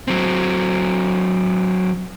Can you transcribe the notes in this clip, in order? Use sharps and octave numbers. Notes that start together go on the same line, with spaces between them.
F#3 C4